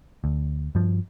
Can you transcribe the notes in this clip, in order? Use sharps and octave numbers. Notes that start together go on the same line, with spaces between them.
D2
G2 F3